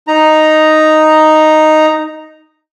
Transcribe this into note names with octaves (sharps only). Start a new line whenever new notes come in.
D#4 A#5